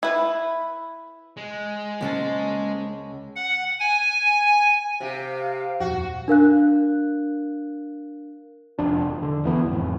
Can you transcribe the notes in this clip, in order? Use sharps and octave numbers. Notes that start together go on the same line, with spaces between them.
E4 B4
G#3
C#2 A#3 C#4 C5 A5
F#5
G#5
C3 G4 F5
D#1 F2 F#4
D4 A#4 F5 F#6
F1 F2 D4
E1
D3
D1 E3 B3
G1 F2
F2 A2